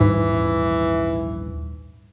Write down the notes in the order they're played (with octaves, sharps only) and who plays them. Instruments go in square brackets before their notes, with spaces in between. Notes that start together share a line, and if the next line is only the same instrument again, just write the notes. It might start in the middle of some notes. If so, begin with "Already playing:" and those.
[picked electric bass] A#1 D#2 G3 [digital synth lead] G#2 [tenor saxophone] E3